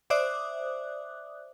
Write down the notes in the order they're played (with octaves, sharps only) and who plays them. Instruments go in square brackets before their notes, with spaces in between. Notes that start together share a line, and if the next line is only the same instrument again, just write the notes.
[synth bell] C5 D5 E5 D6 D#6 F#6